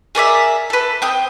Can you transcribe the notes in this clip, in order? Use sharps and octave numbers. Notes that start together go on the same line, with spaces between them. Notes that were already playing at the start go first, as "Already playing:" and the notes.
G#4 A#4 D5 E5
A4 B4
C4 G5 D#6